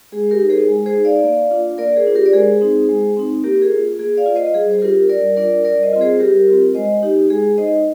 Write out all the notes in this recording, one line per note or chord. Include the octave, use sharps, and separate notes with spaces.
G#3 G#4
G4 A#4
D#4
G#4 C5
G#3
G#4 C5
D#4
D5 F5
A#3
D4 F4
A#3 A#4 D5
G#4 C5
D4 F4
G4 A#4
D5
G#3 G#4 C5
C4 D#4
G#3
C4 D#4
A#3 G4 A#4
G#4
F4
A#3 G#4
D5 F5
F4
C5 D#5
G3 G#4
C5
D4 F4 G4 A#4
G3 A#4 D5
D4 F4 A#4 D5
G3 A#4 D5
C5 D#5
C4 F4
G#4 C5
G3 G4 A#4
C4 F4
G#3 C5 D#5
D#4 G4
G#3 G#4
D#4 C5 D#5